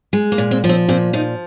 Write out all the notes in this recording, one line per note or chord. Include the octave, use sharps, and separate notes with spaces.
G#3
A#3
A#2
C4
F3
C4
A#2 C4
F3 D#4